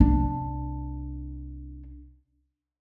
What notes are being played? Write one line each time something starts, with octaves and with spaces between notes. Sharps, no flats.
C2 D4